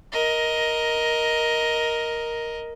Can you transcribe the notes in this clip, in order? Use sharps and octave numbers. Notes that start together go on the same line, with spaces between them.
A#4 D#5